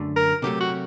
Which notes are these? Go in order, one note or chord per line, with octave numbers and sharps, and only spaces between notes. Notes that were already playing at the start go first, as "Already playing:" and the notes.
Already playing: F#2 D3 A3
A#4
C3 D#3 F#3 A3 G4
F#4